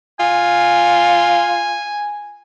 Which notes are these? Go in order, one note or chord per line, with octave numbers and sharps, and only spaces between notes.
F4 G#5